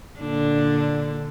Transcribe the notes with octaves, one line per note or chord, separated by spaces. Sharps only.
A#2 D3 D4